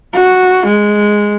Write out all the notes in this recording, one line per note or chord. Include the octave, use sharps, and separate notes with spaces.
F#4
G#3